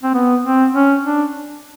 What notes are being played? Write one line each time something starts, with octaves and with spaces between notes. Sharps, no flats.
C4
B3
C4
C#4
D4